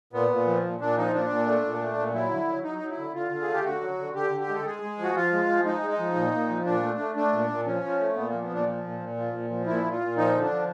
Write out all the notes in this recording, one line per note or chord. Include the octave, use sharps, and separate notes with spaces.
A#2 B3
A#2
F3
A#2
A#2 D4
F3 D#4
A#2 D4
A#2
A3
A#2
A3
A#2
F#3 E4
D3
F#3
F#3 D#4
F#3
E4
D3
D3 F4
D3
G#4
A3
G4
D3 F#4
F#3
D3
D3 G4
D3
G4
G#3
A4
G#3 G#4
G#3
F3
F#4
F3 F4
G#3
F3
G#3 D#4
G#3
D#4
F3
A#2
A#2
F3
A#2 D4
A3
A3
A3 D4
A#2
A#2
F3 C#4
F3
A3
A#2 B3
F3 A#3
B3
A#2 D4
F3
A#2
A#2
F3
A#2
F3
A#2 E4
A#2
F4
A#2
F3 D#4
D3
D4
F3